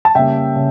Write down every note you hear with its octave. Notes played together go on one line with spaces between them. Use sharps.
A5
C#3 G3 A#3 E5 G5
C#3